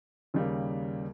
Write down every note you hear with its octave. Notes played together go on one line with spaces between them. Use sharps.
D#2 C#3 G3 A#3